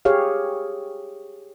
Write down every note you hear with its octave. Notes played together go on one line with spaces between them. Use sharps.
G4 G#4 C#5 F5